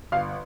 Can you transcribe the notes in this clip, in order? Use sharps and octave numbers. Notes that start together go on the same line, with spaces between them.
G1 F5